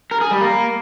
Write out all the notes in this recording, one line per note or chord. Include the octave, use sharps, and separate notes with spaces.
A#4
G#4
G3
A#3